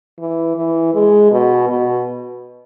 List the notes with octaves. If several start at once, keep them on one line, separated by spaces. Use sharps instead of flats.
E3
E3
G#3
B2
B2